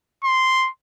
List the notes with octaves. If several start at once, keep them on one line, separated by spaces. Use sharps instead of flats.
C6